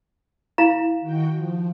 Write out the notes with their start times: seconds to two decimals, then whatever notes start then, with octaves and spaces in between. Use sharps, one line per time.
0.58 E4 F5 A#5
1.01 D#3 F#4 G5
1.35 F3